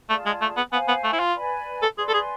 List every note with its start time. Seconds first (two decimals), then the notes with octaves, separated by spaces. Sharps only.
0.10 A3 F4 G#4 D5 A5
0.26 G#3
0.41 A3
0.57 B3
0.72 B3 C5 F5 G#5
0.88 B3
1.04 A3
1.13 E4
1.19 F4
1.35 B4 D5 G#5 B5
1.82 A4
1.97 G#4 B4 D5 G#5 C6
2.09 A4
2.14 G#4